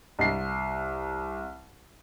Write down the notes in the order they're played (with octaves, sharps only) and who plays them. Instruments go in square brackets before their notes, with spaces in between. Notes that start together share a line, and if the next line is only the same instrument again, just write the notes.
[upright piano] C2 C7